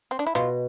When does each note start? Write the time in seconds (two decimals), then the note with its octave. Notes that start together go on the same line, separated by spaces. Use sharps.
0.11 C4
0.19 D4
0.27 E4
0.35 B2 F4